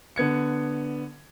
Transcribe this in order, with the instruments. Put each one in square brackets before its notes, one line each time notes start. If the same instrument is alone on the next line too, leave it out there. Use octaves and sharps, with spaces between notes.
[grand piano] D3 B3 G#6 C#7